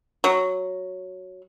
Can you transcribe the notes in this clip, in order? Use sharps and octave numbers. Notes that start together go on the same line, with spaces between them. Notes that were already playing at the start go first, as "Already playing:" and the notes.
F#3